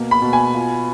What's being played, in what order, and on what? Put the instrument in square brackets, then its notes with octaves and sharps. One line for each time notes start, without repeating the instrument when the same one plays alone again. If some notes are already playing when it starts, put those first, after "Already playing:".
Already playing: [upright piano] B2 A#3
[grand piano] B5
[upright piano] B2
[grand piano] G#5
[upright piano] F4